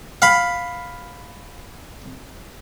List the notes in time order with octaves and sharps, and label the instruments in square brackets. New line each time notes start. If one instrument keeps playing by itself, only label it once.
[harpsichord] F5 B5